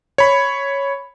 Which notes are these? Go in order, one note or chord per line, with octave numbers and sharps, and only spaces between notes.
C#5 B5